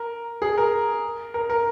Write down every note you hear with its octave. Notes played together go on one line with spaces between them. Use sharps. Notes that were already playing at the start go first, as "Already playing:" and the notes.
Already playing: A#4
G#4
A#4
A#4
A#4